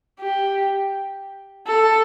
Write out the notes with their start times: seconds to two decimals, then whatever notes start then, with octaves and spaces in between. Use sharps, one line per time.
0.20 G4
1.67 A4